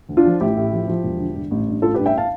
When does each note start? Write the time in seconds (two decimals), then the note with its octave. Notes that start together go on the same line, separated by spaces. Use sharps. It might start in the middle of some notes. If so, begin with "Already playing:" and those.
0.09 D2
0.17 D4 F4
0.25 F3
0.40 A1 E4 G4
0.57 A2
0.72 F3
0.88 F3
1.04 E1
1.20 D3
1.35 G2
1.51 A1
1.67 G2
1.82 A1 F4 A4
1.94 G4 B4
1.99 G2
2.06 E5 G5
2.18 F5 A5